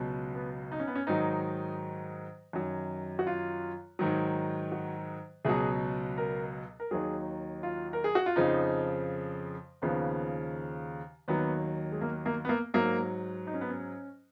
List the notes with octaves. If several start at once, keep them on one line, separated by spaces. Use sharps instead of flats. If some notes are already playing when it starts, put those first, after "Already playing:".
Already playing: C#2 B2 F#3
B3
D#4
C#4
B3
C#4
G#2 D#3 F#3 D#4
F#2 D#3 F#3
F#4
F4
G#2 D#3 F#3
F#4
C#2 B2 F#3 G#4
A#4
A#4
D#2 D#3 F#3 G#4
F4
A#4
G#4
F#4
F4
F2 C#3 F3 D#4
D#2 C#3 F3 B3
D#2 D#3 F#3 B3
G#3
A#3
A#3
B3
A#3
G#2 F#3 A#3
D#4
C#4
B3
C#4